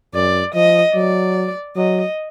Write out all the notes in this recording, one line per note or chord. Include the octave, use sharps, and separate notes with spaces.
F#2 D5
F3 D#5
F#3 D5
F#3 D#5